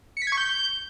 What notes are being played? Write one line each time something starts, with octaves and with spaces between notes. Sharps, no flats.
C#7
B6
G#6
C#6
G6